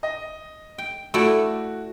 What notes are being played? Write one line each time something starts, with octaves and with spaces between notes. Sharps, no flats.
D#5
G5
A3 E4 F#4 D5